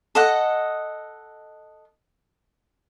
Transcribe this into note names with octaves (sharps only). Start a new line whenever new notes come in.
A4 D#5 F#5